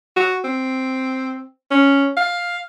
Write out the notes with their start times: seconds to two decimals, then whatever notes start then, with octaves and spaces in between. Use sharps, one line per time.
0.16 F#4
0.44 C4
1.71 C#4
2.17 F5